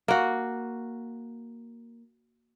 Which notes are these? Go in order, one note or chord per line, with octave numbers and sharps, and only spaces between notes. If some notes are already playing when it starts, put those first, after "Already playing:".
A#3 F#4